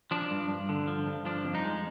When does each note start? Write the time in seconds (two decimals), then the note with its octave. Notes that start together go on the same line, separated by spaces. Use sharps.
0.11 F3 D4
0.31 G2
0.49 G2
0.69 D3
0.87 F3
1.07 G2
1.25 F3 D4
1.45 F2
1.55 D#4
1.65 G#3